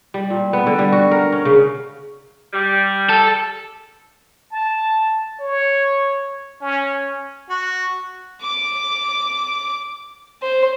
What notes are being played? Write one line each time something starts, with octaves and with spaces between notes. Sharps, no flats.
G3
A#2
B3
D3
G3
F#4
A#4
C#4
C#3
G3
A4
A5
C#5
C#4
F#4
D6
C5